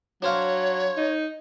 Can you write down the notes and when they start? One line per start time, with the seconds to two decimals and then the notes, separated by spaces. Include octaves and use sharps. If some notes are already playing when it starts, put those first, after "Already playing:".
0.22 F#3 D4 C5 C#5 F5
0.97 D#4